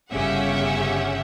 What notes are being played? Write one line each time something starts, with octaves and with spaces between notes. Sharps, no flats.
G1 C#3 C#4 G4 E5 F#5